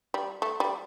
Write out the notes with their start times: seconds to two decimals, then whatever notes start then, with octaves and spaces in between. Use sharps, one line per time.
0.14 G3
0.42 A3
0.60 G3